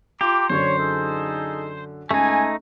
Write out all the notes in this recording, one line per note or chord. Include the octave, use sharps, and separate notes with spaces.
F4 G4 A#5 C6 D6
F#2 D3 C5 C#5
D#4 G#4 A4
C#2 A3 D#4 G#5